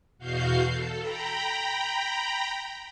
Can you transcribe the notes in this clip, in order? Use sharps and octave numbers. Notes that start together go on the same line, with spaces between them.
E2 B2 F#4 F5 G6 C7
A4
G5 A#5 B5